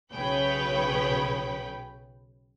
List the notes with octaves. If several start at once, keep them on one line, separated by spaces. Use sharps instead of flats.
B1 C#3 B4 C#5 G5 B5